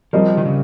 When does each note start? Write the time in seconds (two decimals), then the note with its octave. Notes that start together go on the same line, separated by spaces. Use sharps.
0.13 F3 G3 C4 G4 A#4 D#5
0.37 D#3
0.46 C#3